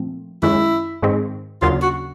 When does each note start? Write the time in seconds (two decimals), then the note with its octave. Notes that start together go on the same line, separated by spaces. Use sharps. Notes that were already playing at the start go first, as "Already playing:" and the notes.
Already playing: A#2 F3 A3 C4
0.43 F#2 D#3 G#3 C#4 E4
1.02 G#2 D#3 G#3 C4 D#4
1.62 D#2 C#3 F#3 A#3 D4 F4
1.82 F#4